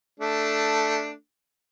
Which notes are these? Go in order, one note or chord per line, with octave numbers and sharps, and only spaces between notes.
A3 D4